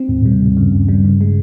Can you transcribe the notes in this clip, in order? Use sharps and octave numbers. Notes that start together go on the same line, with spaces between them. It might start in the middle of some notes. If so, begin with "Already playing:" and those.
Already playing: C4
D#2 G#2
A#2 G3
C3
D#2 G#2
G2 C#3
D#2
G3
C#3
G#3